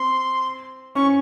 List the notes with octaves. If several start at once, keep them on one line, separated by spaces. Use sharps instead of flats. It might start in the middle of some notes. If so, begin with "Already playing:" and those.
Already playing: C4 C6
C#4 C#6